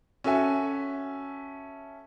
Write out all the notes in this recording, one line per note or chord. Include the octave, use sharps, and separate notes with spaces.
C#4 F#4 A4 E5 G#5